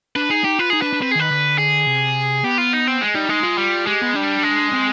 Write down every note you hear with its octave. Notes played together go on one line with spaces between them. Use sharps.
D4 B4
D#4 G#4
D#4 G4
F4 B4
D#4 G#4
D4 B4
D4
C4 B4
G#4
D#3 B4
D3
G#4
C3
B3 G4
F4
D#4
C4
G#3
G3 D#4
G#3 D#4
F4
G3
G#3 G4
B3
G3 D4
G#3
C4